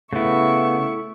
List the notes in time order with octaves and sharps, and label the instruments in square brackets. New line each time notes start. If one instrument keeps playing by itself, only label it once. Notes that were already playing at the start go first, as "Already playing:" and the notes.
[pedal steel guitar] C#3 B3 [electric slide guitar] A3 E4 [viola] E5 C#6